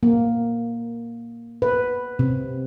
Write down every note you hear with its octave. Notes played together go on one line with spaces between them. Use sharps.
A#3
B4
C3